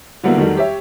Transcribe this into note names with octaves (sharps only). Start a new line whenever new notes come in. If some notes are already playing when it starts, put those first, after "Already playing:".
D3 F#3 G3 A#3 B3 E4
D#3 F#3 G3 A3
G4 C#5 E5